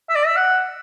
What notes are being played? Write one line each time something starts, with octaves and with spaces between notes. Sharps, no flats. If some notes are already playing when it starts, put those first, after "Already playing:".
E5
D5
E5
F#5